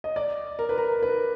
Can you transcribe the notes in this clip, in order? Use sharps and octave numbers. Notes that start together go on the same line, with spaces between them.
D#5
D5
A#4
B4
A#4
B4